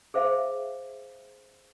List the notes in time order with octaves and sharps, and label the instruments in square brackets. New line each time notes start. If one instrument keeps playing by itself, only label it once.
[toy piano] G#4 C5 E5 F5